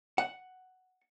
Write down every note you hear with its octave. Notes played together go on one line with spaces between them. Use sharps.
F#5